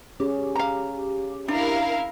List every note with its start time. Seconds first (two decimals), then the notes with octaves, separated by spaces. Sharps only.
0.20 C#4 G4 G#4
0.56 F5 A#5
1.48 D4 E4 A#4 F5